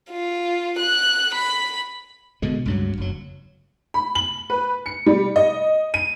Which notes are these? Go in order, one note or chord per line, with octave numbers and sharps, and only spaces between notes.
F4
F#6
B5
B2 D3 G#3
C#2 G2 F#3
F#1 F#3
B5
F#7
B4
C#7
G3
D#5
D#7